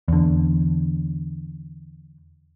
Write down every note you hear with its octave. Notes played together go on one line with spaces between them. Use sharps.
E2 D3